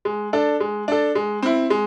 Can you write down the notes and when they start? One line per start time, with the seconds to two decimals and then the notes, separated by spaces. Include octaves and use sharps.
0.05 G#3
0.33 D4 A4
0.60 G#3
0.88 D4 A4
1.15 G#3
1.43 C4 E4
1.70 G#3